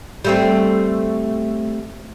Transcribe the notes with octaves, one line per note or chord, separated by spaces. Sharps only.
G3 A3 C4